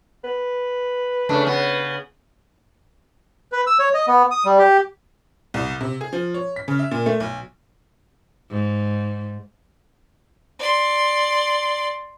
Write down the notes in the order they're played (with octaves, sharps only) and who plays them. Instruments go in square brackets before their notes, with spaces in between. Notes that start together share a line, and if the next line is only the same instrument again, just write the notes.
[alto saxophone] B4
[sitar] C#3 A3 D4
C#3 B3
[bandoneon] B4
E6
C#5
D#5
B3
D#6
G3
G4
[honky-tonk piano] C2
C3
G#4
F3
C#5
B6
C#3
E5
A#2
A3
B1
[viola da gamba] G#2
[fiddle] D5 C6